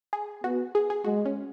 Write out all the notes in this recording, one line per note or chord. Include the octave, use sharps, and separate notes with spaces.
G#4
B3 F#4
G#4
G#4
G#3 F#4
C#4